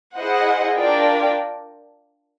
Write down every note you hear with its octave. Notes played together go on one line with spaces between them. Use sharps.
E4 G#4 C5 D#5 F#5
D4 F4 A#4 D5 G5